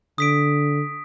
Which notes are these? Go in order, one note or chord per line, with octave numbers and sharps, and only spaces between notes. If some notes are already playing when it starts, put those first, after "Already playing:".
D3 D#6 B6 D7